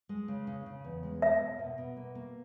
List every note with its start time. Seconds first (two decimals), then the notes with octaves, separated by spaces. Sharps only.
0.09 G#3
0.28 C#3
0.47 C#3
0.66 C#3
0.84 E2
1.03 G#3
1.22 A#3 E5
1.41 B2
1.59 B2
1.78 B2
1.97 A#3
2.15 A#3